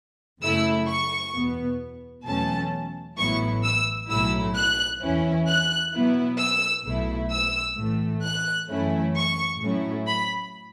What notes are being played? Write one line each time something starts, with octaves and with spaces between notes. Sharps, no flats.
F#2 C#3 A3 E4 E6
C#6
E2 B2 B3
E2 B2 F#3 A3 C#4 A5
A1 A2 F#3 B3 E4 C#6
E6
B1 A2 F#3 A3 E4 E6
F#6
E2 E3 C#4 E4
F#6
B2 F#3 B3 E4
E6
B1 B2 A3 E4
E6
A2 E3 A3
F#6
F#2 E3 A3 C#4 E4
C#6
A2 F#3 A3 C#4 E4
B5